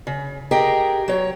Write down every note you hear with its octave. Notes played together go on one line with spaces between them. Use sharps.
C#3
G4 G#4 A#4 D#5 G5
F#3 C#5